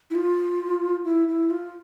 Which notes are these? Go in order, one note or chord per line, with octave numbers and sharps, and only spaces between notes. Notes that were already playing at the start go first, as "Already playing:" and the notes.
E4
F4
E4
E4
F4